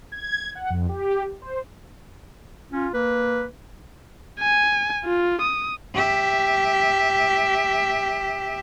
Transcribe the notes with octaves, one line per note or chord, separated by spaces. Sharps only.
G#6
F#5
F2
G4
C5
C#4 F4
A#3 B4
G#5
F4
D#6
G4 E5